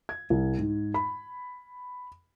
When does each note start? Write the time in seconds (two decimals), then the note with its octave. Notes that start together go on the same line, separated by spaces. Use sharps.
0.09 G#6
0.30 C2
0.59 G#2
0.94 B5